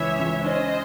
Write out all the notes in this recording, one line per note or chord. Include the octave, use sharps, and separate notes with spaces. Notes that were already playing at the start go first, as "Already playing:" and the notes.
Already playing: C#2 E3 C#5 E5
C#2
C#4 C5 D#5